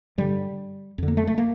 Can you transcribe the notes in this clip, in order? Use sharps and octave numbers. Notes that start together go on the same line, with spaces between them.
G2 D3 G3
F2 D3
A#3
A3
A3
A#3